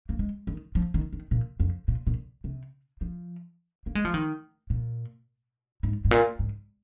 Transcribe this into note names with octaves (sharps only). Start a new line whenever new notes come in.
A#3
G#3
D#3
F3
D#3
D#3
A#2
F2
A#2
A#2
C3
F3
A#3
G#3
F3
D#3
A#2
G#2
G#2
A#2
G#2